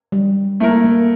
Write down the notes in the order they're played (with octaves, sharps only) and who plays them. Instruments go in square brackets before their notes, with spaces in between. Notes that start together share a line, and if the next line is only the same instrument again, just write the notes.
[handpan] G3
[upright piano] A3 E4 A#4 [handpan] A#3
[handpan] A#3